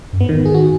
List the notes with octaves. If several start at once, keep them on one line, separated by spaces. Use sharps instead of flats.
F#2
G#2 B3
D#3
G#4
F#4